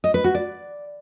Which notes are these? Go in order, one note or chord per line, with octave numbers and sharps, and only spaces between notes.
D#5
B4
F#4
D5